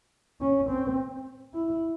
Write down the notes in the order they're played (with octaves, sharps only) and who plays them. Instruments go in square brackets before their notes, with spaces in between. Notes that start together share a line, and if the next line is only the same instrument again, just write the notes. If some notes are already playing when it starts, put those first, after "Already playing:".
[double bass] C#4
C4
E4